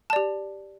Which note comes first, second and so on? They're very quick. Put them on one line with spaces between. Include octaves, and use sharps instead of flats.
A5 D5 G4